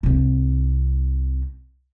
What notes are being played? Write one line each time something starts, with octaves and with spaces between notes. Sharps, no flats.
C2 C4